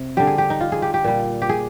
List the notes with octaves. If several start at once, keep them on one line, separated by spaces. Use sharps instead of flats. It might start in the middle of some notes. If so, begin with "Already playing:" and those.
Already playing: C3
D3 G3 G4
G#4
G4
D#4
F4
G#4
G4
G4
A#2 G3
G4
G#4